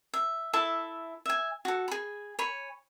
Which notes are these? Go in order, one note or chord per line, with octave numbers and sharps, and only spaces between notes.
E5
E4 A4 E5 A5
E5 G#5
F#4 A4
G#4 B5
C#5 G#5 B5